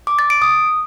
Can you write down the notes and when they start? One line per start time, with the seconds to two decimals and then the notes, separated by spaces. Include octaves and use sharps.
0.07 D6
0.19 A6
0.30 D7
0.42 D#6